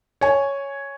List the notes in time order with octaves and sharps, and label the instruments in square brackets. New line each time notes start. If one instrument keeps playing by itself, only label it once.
[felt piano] C#5 G#5